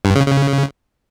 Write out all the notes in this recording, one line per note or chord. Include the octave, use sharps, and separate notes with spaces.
G2
C#3
C#3